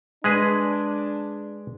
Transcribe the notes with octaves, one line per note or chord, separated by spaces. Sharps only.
G#3 D4 G#4 B4